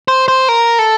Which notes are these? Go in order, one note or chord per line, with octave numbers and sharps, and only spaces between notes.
C5
C5
A#4
A4